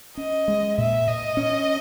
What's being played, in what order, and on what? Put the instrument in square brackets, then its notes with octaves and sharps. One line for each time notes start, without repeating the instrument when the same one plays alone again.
[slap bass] C#4 [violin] D#5
[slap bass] G#3
[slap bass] A#2 [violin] E5
[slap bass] A#2 [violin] D#5
[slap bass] C#4